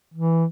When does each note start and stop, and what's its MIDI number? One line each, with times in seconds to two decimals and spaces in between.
0.14 0.45 52